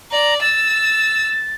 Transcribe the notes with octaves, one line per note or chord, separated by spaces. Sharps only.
D5 A#5
E6 A6